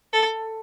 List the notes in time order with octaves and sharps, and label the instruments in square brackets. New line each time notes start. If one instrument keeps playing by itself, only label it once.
[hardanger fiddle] A4